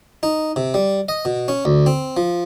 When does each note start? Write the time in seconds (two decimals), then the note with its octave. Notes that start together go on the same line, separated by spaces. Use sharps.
0.23 D#4
0.56 C3
0.74 G3
1.09 D#5
1.25 B2
1.48 C#4
1.65 D2
1.86 C4
2.17 F3